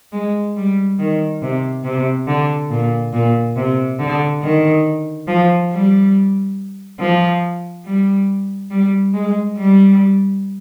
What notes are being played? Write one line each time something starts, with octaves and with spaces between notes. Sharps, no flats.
G#3
G3
D#3
C3
C3
D3
A#2
A#2
C3
D3
D#3
F3
G3
F3
G3
G3
G#3
G3